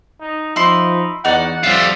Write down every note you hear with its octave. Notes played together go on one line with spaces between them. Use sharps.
D#4
F3 D#4 E4 C6
E2 D#4 F#4 D5 F#5
F2 G3 F4 E5